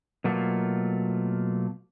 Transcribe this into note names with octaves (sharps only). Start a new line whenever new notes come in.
B2 F#3 A3 A#3 F4